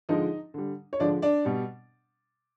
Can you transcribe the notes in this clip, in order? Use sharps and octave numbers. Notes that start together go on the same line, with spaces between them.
D3 F3 G#3 D#4 D#5
D3 G3
C#5
D3 F3 G#3 D4 D5
D4 D5
B2 G3